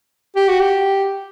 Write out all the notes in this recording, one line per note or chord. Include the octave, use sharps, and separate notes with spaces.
G4
F#4
G4